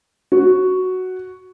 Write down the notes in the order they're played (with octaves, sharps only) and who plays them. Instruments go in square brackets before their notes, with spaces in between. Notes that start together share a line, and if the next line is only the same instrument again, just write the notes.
[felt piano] F#4